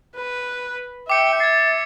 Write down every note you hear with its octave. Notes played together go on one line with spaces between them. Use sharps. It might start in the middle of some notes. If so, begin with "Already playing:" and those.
B4
E5 G5 D6 C#7
G#6 A6 C7